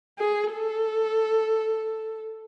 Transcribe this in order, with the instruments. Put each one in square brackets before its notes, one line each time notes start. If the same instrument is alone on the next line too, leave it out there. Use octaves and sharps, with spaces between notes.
[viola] G#4
A4